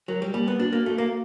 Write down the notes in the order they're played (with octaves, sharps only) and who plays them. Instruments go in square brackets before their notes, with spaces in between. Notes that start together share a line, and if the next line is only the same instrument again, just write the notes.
[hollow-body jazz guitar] F#3 [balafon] A#4
[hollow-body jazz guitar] G3
[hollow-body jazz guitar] G3 [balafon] A#3
[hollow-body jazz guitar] B3
[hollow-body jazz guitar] D4 [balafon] F#4
[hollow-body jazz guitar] A#3
[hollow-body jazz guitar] A3 [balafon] F#4
[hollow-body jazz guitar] A#3